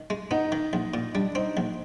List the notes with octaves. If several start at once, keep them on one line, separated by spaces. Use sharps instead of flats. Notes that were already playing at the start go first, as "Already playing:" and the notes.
Already playing: D#3
G#3
B3 D#4
D#3
A#1
A#2
G3 D4
C4 D#4
A#1